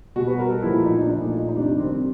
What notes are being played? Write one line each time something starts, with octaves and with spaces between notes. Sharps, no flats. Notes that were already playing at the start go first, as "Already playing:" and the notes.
B2 G3 F#4
B4
A#4
A4
A#2 F3 A3 E4
D#4
D4
A#2 F3 A3 D#4
D#4
C3 D#3 G3 D4
C4